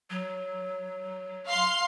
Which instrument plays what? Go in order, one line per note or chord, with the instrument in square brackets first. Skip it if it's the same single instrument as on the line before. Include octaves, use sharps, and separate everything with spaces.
[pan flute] F#3
[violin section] F5 C6 C7